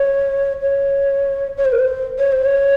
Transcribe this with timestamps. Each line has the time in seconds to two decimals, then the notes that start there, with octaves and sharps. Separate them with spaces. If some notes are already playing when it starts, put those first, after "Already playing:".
Already playing: C#5
0.62 C#5
1.57 C#5
1.65 C5
1.72 A#4
1.80 C5
2.19 C#5
2.32 C5
2.45 C#5